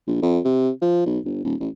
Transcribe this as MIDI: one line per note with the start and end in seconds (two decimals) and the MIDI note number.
0.08 0.17 34
0.22 0.39 41
0.45 0.69 48
0.82 1.05 53
1.06 1.18 35
1.25 1.44 31
1.44 1.55 27
1.60 1.69 33